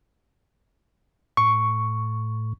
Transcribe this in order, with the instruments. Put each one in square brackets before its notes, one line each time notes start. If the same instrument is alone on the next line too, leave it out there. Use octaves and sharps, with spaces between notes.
[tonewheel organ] A2 [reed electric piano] C#6